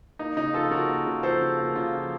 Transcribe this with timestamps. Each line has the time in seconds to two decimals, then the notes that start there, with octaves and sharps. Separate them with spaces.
0.19 A#3 D#4
0.37 C#3 D#4
0.54 F3 F4 A4
0.71 C#3 F#4 A#4
0.89 A#3
1.06 C#3
1.23 F3 A4 C5
1.41 C#3
1.58 A#3
1.75 C#3 F4
1.93 F3